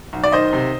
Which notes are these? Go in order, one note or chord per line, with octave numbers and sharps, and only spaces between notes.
B1
D5
D#3 C5 D#5
C3